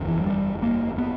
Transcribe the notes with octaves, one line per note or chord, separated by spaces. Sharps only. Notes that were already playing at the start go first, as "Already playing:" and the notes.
Already playing: F#1 E2 D3
E3
F#3
G3
A#3
B3